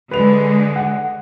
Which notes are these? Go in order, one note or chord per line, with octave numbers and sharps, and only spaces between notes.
D3 G#3 B4 F7
F#5